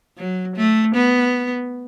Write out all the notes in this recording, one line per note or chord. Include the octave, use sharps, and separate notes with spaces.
F#3
A3
B3